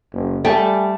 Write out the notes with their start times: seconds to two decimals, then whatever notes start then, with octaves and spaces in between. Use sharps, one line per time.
0.13 F#1
0.45 G3 A3 G5 G#5